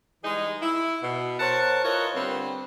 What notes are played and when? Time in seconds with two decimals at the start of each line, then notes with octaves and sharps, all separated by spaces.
0.24 E3 G3 G#3 D#4 G#4
0.62 E4
1.02 B2
1.40 A#4 C5 C#5 F#5 A5
1.84 E4 F4 A#4 B4 C#5 D#5
2.15 D3 G3 B3 C4